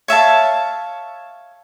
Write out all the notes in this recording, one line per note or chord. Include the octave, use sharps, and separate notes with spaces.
C#5 E5 F5 A5